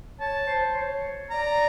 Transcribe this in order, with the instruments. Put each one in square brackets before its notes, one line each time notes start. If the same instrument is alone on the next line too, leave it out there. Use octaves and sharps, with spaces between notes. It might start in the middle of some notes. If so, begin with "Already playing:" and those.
[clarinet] C#5 [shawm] A5
[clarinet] C5
C#5
[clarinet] D5 [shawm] A#5